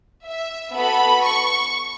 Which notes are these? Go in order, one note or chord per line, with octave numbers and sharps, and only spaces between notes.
E5
B3 F#4 A4 B5
C#6